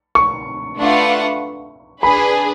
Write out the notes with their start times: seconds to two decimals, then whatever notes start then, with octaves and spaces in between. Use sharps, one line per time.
0.15 C#6
0.77 A3 D4 F4 B4 F#5
2.03 D4 G#4 B4 B5